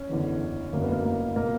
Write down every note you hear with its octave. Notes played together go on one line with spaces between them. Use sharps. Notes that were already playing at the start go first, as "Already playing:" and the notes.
Already playing: C#4
F#1 E2 D3
F#1 F#2 D3 A#3
B3
A#3
A#3
B2 A#3